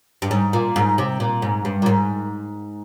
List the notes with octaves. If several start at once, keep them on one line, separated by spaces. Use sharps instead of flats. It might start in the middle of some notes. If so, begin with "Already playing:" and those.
G2
G#2
A#2
G#2
C3
A#2
G#2
G2
A#2
G#2